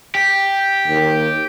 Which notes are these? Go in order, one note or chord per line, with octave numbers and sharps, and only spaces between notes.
G4
D#2